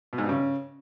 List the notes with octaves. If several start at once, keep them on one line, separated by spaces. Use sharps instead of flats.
B2
G#2
G2
C#3